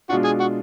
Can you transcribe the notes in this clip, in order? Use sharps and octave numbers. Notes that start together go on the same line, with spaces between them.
B2 G#3 D4 F4 F#4
G#4
F#4